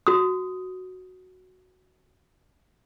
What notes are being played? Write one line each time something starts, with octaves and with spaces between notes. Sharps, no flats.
F#4 D#6